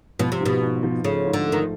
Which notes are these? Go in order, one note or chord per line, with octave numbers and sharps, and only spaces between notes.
B2 F3
C3
G#2
B2
G#2
F3
C#3 A3
G#2
D3
D#3 A3